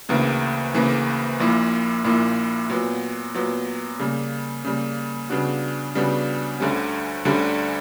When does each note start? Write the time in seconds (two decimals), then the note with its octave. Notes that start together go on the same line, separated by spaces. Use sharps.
0.09 D2 C#3 E3 A#3
0.74 D2 C#3 E3 A#3
1.39 A#1 A#2 A#3 E4
2.04 A#1 A#2 A#3 E4
2.70 A#2 F#3 B3
3.34 A#2 F#3 B3
3.99 C#3 G3 A#3
4.65 C#3 G3 A#3
5.30 C#3 G3 B3 D4 F#4
5.95 C#3 G3 B3 D4 F#4
6.60 D2 D3 G3 C#4
7.25 D2 D3 G3 C#4